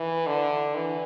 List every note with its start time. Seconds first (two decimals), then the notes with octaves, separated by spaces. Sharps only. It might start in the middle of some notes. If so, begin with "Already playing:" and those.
Already playing: E3
0.27 D3
0.75 E3